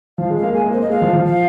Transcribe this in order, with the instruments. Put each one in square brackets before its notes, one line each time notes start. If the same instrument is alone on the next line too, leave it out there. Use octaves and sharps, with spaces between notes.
[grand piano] F3 [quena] F5
[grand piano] G#3
[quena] F5
[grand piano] A#3
[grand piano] G#3 [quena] G#5
[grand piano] A#3
[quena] C5
[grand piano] A#3 [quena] D#5
[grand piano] G#3 [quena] F5
[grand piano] F3
F3
[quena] F5